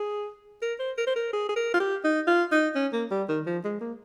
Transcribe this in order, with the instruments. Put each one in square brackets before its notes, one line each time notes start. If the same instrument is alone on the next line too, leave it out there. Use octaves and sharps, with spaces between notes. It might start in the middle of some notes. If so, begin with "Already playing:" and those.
Already playing: [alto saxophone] G#4
A#4
C5
A#4
C5
A#4
G#4
G#4
A#4
F4
G4
D#4
F4
D#4
C#4
A#3
G3
D#3
F3
G#3
A#3